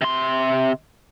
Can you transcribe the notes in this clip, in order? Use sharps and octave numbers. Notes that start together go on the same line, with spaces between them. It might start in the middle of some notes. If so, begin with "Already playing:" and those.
C3 C6